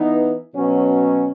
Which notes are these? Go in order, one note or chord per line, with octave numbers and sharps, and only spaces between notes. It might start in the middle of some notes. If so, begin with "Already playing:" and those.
Already playing: E3 B3 D#4
B2 F#3 C#4